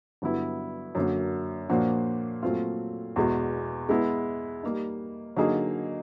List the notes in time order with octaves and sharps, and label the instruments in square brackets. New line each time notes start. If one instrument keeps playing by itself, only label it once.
[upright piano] G2 D3 F#3 B3 E4
F#2 D3 F#3 A#3
A#2 F3 A#3 D4 F#4
A#2 F#3 A3 C4 F4
E2 B2 G#3
G#3 B3 E4
G3 A#3 D#4
D3 F#3 A#3 D#4 G#4